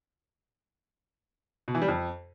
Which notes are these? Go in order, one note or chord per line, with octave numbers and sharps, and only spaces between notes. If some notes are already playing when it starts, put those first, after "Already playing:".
B2
E3
G3
F2